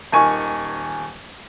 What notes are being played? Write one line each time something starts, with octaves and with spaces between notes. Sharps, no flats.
D#1 D#3 G#5 C#6